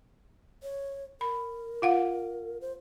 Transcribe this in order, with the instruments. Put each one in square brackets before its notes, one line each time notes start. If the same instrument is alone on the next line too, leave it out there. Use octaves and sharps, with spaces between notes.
[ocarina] C#5
[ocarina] A#4 [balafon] B5
[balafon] F4 F5 F#5
[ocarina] C5